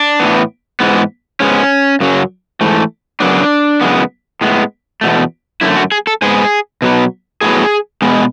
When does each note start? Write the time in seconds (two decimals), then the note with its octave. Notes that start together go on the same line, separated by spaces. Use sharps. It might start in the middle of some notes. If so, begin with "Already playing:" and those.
Already playing: D4
0.20 A2 E3 B3
0.80 G#2 E3 G#3 B3
1.40 G#2 G#3 B3 C#4
2.00 F#2 C#3 F#3
2.61 G#2 E3 A3
3.20 F#2 C#3 F#3 B3 D4
3.81 F#2 C#3 E3 G#3 B3
4.41 A2 G#3 B3
5.01 E2 B2 A3
5.61 F#2 D3 A3 E4
5.76 F#4
5.92 G#4
6.07 A4
6.22 G#2 G#3 B3 G#4
6.82 B2 F#3 B3
7.41 A2 F#3 B3 G#4
8.02 B2 G#3 B3